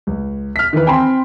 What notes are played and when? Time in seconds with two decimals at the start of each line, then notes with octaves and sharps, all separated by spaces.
0.07 C#2
0.56 F6 B6
0.73 D#3 E3 E4 B4
0.86 C4 G5 G#5 B5 C6